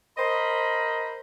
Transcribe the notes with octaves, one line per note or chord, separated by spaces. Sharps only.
A#4 C5 D#5 B5